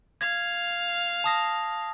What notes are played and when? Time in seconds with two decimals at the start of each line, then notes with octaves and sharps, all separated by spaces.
0.21 F5 G#6
1.24 A5 D#6 A#6